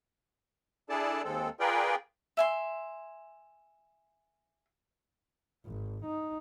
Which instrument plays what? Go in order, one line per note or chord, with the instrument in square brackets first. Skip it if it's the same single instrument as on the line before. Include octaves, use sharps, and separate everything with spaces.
[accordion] D4 E4 G#4 A4 D5 A5
D#2 G#3 C4 A4
F4 G#4 A#4 B4 D5 G5
[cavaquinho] E5 G#5 C6
[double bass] G#1
D#4